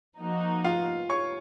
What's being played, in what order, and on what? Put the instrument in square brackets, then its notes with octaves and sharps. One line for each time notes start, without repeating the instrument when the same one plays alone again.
[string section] F3 A#3 D#4 F#4
[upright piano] F4 F5
C#5 C#6